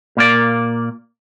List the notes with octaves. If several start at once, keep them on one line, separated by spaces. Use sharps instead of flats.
A#2 A#3 D5